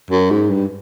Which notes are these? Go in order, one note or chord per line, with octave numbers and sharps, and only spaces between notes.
F#2
G#2
G2